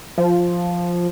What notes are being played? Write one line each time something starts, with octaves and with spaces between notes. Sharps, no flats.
F3